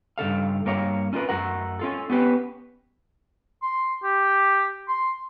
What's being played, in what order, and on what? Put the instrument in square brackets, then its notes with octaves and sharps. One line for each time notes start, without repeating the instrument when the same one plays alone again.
[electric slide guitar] G2 C#3 A4 F5
G2 A#3 A#4 C#5 F5
C#4 D4 F4 A#4 B4
F#2 A3 A#4 F#5
C#4 F4 A4
B3 C#4 G4 B4
[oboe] C6
G4
C6